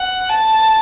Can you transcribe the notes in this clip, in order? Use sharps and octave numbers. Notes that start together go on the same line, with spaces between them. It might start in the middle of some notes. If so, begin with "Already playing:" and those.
Already playing: F#5
A5